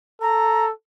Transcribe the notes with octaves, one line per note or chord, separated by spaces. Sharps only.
A4 A#5